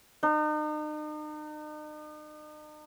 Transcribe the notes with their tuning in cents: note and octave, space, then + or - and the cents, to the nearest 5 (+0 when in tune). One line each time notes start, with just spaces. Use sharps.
D#4 -40